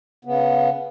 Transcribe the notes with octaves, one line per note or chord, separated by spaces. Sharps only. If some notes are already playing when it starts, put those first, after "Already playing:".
C#3 B3